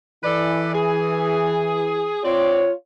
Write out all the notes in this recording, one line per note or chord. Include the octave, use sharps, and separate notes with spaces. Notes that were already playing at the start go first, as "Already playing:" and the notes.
E3 A4 B4 D5
G#4
C4 F4 C#5 D5